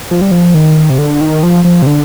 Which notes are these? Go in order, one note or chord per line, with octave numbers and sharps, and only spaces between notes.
F3
G3
F3
D#3
C3
D3
D#3
F3
F3
C3
D3